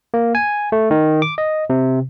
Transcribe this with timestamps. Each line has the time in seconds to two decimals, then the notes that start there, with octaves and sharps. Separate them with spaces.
0.14 A#3
0.35 G#5
0.72 A3
0.91 D#3
1.22 D6
1.38 D#5
1.70 C3